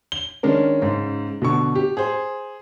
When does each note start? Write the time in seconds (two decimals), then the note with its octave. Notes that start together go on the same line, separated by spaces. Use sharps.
0.12 G7
0.43 D#3 G#3 C#4 D4 A#4
0.82 G#2 C#3
1.42 B2 D3 C#6
1.75 G4
1.97 G#4 C5